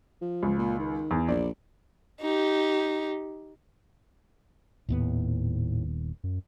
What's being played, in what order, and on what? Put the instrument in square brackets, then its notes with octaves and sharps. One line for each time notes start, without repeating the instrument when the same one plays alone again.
[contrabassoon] F3
[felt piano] C#2
[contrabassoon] A#2
D#3
[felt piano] E2
[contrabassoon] A#1 [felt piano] D5
[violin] D#4 G4
[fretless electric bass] D#1 D#2 B3 [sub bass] A2
[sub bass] F#2